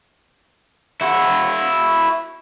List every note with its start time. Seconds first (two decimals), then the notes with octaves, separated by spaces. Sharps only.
1.01 E4 F#4